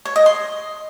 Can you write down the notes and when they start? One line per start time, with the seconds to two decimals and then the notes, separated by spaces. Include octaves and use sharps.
0.05 C#5
0.16 D#5
0.26 C6